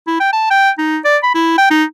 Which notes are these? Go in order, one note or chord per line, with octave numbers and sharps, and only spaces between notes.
E4
G5
A5
G5
D#4
D5
B5
E4
G5
D#4